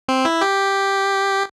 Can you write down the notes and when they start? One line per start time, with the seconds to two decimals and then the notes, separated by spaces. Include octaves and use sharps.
0.09 C4
0.25 E4
0.41 G4